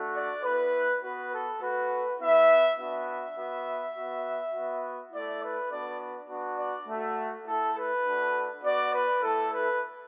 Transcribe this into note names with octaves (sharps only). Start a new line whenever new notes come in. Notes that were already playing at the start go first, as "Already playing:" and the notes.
Already playing: A3 D4 F#4
D5
B3 E4 B4
B3 F#4 B4
A4
A3 F#4 B4
B3 E4 E5
B3 D4 F#4 E5
B3 F#4
B3 F#4
B3 F#4
A3 E4 D5
B4
B3 D4 F#4 D5
B3 D4 F#4
D5
A3 F#4
A3 E4 A4
B4
A3 D4 F#4
B3 F#4 D5
B4
A3 E4 A4
B4